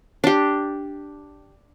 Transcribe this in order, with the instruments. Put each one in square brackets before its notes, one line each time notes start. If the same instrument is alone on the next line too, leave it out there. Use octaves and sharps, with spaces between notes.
[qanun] D4 G4